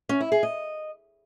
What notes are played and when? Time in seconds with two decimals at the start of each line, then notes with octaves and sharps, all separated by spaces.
0.09 C#4
0.20 E4
0.32 G#4
0.43 D#5